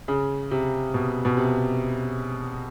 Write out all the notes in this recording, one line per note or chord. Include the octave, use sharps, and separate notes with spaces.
C#3
C3
B2
B2
C3